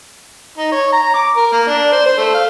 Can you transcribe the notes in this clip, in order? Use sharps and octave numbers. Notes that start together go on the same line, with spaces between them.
D#4
C#5
A#5
D6
A#4
A#3
D4
C5
C5
A3
F5